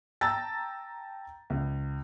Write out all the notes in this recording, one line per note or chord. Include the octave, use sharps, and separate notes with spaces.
G5 A5 A#5 E6 A6
C#2